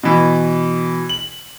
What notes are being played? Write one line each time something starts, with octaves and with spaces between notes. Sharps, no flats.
B2 E3
F#7